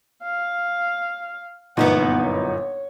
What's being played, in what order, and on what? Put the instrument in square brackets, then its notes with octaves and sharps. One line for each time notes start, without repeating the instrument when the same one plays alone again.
[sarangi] F5
[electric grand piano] G1 A#2 D#4 [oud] F#2 E3 B3 [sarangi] F#5
[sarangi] C#5